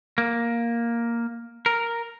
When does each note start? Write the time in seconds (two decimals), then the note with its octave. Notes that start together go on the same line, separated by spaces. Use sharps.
0.18 A#3
1.66 A#4